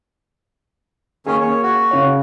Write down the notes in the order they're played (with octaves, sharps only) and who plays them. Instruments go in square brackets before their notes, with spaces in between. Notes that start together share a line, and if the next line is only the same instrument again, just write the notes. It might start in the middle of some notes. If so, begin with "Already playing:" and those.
[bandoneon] D#3 C#4 [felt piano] A#3 G#4
[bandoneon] C#5
F#4
[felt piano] C#3 C#5